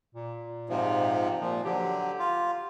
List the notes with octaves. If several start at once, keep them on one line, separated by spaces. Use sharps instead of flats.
A#2
G#2 C3 F3
A#2 F3
D3 F#3 G4
F4